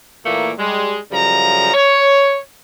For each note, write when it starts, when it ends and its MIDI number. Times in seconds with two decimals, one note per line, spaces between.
0.25 0.52 46
0.25 0.52 52
0.25 0.52 57
0.25 0.52 58
0.58 0.98 55
0.58 0.98 56
1.11 1.74 42
1.11 1.74 49
1.11 1.74 53
1.11 1.74 55
1.11 1.74 82
1.74 2.37 73